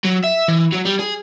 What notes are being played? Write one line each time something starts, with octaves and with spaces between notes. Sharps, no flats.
F#3
E5
E3
F#3
G3
G#4